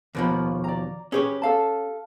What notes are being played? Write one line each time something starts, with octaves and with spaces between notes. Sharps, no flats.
D#2 B2 F3 A#4 B5
D5 A#5
C#4 G4 G#4 B4 C#5
A4 F5 A5